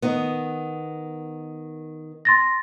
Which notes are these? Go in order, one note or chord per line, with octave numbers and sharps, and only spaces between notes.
D#3 B3
C6 A6 A#6